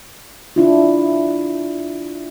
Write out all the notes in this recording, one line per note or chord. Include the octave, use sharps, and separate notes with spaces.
D4 E4 F4